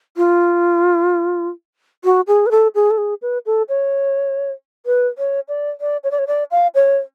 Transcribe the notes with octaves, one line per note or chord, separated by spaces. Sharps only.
F4
F#4
G#4
B4
A4
G#4
A4
G#4
B4
A4
C#5
B4
C#5
D5
D5
C#5
D5
C#5
D5
F5
C#5